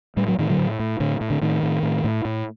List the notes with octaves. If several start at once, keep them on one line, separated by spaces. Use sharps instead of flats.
A2 G3
F#3
A2 D#3
D3 F#3
A2
A2
A2 D3
A2
D3
A2 D#3
A2
A2
A2
A2